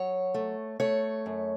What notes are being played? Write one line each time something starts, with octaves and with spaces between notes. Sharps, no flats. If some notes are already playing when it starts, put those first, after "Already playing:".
Already playing: F#3 C#5
A3
A3 C#5
F#2